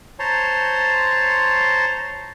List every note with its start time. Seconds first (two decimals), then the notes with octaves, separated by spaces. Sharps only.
0.19 C5 C#5 A5 A#5 C6